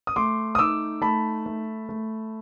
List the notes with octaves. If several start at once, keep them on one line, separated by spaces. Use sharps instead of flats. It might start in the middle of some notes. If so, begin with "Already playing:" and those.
D#6
A3 C6 D6
D#6
D#4 D6 E6
A3 A5 B5
A3
A3